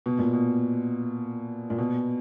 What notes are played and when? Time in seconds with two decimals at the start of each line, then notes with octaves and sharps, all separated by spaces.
0.06 B2
0.19 A#2
0.33 B2
1.70 A#2
1.78 B2